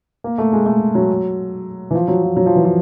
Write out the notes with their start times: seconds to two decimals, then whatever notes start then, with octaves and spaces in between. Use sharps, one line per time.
0.24 A#3
0.38 A3
0.53 G#3
0.66 A3
0.95 F#3
1.91 E3
1.95 F3
2.08 F#3
2.23 F3
2.36 F#3
2.46 F3
2.55 E3
2.64 F3